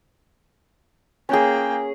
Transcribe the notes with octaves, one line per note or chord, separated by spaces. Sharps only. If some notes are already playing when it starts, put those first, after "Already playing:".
A#3 C#4 G#4 G5